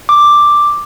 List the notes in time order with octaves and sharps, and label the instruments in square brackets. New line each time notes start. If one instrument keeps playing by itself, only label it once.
[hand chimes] D6